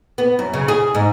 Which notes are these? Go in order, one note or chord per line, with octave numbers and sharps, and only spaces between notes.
B3
F#2
C#3
G#4
G#2